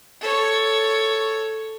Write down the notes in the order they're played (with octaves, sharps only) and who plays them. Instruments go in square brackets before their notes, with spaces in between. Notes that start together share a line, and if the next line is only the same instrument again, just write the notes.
[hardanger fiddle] A4 C#5